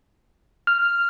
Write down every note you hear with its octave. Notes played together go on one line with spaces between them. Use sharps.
F6